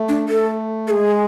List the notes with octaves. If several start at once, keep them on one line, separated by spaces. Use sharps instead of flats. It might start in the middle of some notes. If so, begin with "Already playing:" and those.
Already playing: A3
D4
A3 A4
A4
G#3 G#4